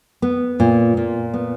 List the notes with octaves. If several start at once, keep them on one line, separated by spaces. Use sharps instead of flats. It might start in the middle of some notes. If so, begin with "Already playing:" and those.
B3
A#2
A#2
B3